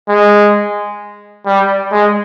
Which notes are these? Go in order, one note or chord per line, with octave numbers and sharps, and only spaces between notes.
G#3
G3
G#3